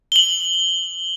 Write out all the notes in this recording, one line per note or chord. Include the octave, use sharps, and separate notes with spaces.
F#7 G7